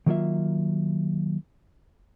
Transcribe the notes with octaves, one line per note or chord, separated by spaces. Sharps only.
D#3 F#3 A#3 D#4 F4 E5